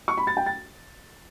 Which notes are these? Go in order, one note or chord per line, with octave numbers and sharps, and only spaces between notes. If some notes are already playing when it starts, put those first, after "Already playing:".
C#6
B5
A6
G5
A6